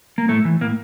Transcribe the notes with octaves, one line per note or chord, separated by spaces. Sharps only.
A#3
A2 A3
E3
A2 A#3